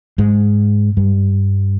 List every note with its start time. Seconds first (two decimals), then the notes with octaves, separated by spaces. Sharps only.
0.18 G#2 G#3
0.97 G2 G3